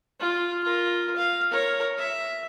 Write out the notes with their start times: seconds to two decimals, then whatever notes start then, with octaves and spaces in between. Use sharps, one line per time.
0.20 F4
0.64 F4 A#4
1.16 F5
1.51 A#4 C#5
1.98 E5